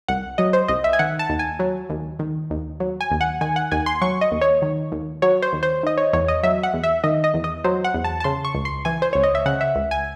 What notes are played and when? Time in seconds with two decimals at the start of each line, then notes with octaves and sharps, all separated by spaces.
0.08 C2 F#5
0.38 F#3 D#5
0.53 C5
0.68 C2 D#5
0.84 E5
0.93 G#5
0.99 D#3 F#5
1.19 A5
1.29 D#2
1.39 G#5
1.59 F#3
1.90 D#2
2.19 D#3
2.50 D#2
2.80 F#3
3.01 G#5
3.11 D#2
3.21 F#5
3.41 D#3 G#5
3.56 F#5
3.72 D#2 G#5
3.86 C6
4.02 F#3 C#6
4.21 D#5
4.31 D#2
4.41 C#5
4.62 D#3
4.92 D#2
5.22 F#3 C#5
5.42 C5
5.53 D#2
5.63 C5
5.83 D#3 D#5
5.98 C#5
6.13 E2 C#5
6.28 D#5
6.43 F#3 E5
6.63 F#5
6.74 E2
6.84 E5
7.04 D#3 D#5
7.24 D#5
7.34 E2
7.44 D#5
7.64 F#3 C5
7.84 F#5
7.94 E2
8.04 A5
8.20 A5
8.24 C#3 C6
8.45 C#6
8.55 C#2
8.65 C6
8.85 E3 G#5
9.02 C5
9.13 C#2 C#5
9.23 D#5
9.35 E5
9.46 C#3 F#5
9.61 E5
9.76 C#2
9.91 G#5